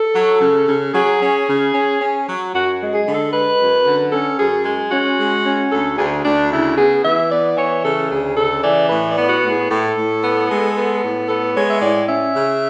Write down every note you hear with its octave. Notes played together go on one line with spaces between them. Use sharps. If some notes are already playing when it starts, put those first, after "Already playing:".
Already playing: A4
F#3
C#3
C#3
F#3 G#4
C#4
C#3
C#4
C#4
F#3
F#2 F#4
G#3
G#4
D3
A4
G#3 B4
F#2
D3
C#4 A4
F#2 G#4
G#3
C#4 F#4
G#3
C#4
D2 A4
D2 G#4
D2 D4
C#3 E4
B3 G#4
E3 E5
B3 D5
E3 C#5
C#3 A4
D2 G#4
C#3 A4
E3 D5
A2 B4
D5
B3
F#4
A2
G#4
A2 A4
A2
B3
G#3
B3
A2
B3 A4
G#3 C#5
E5
A2 D5
C#4 E5
C#3